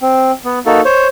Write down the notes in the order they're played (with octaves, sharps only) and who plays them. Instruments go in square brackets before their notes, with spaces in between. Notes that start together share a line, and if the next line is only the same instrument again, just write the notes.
[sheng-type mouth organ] C4
B3
A#3 D#4 F#4 A4
C5 C#5